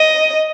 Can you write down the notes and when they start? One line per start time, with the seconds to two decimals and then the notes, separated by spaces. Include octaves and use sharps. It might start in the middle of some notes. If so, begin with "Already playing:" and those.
Already playing: D#5